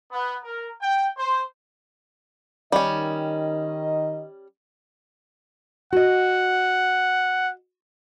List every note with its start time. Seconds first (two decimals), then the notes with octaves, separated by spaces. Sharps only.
0.11 B3
0.42 A#4
0.81 G5
1.17 C5
2.72 D#3 G3 C#4 D#5
5.93 F#4 D#5 F#5